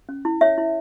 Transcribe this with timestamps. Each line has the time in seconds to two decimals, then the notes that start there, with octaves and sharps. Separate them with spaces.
0.09 C#4
0.25 E4
0.41 C#5 E5
0.58 E4